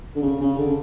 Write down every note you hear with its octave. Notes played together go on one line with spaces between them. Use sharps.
D3
C#3
C#3
D3